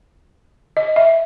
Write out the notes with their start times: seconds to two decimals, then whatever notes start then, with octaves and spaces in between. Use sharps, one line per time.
0.77 D#5
0.96 E5